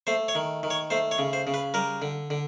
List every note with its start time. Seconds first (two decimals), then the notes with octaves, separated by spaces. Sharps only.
0.07 A3 C5
0.28 C#5
0.35 D#3
0.63 D#3
0.70 C#5
0.90 A3 C5
1.11 C#5
1.18 C#3
1.33 C5
1.47 C#3
1.54 B4
1.74 G3 A#4
2.02 D3
2.30 D3